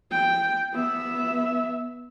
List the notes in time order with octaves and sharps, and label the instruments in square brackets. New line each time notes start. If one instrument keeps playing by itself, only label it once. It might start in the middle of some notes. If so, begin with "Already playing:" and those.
[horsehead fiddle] G5
B3 E5